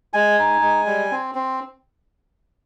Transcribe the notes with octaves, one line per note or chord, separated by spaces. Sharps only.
G#3 G#5
D#4
G#3
G3
C4
C4